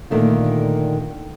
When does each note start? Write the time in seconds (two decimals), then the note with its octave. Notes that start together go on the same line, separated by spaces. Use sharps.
0.10 A#2 D3 D#3 A3 F4